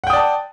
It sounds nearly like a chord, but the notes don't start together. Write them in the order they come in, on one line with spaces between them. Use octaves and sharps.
F#5 G5 D#6 D5 A5